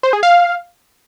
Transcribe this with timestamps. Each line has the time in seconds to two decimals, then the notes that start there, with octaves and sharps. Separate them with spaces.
0.03 C5
0.13 G#4
0.23 F5